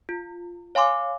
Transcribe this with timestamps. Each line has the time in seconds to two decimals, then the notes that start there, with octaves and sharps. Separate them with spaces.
0.09 F4
0.75 C#5 F5 G#5 C6 D6